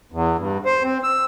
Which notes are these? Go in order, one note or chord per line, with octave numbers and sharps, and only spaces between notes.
E2
G2
C5
C4
E6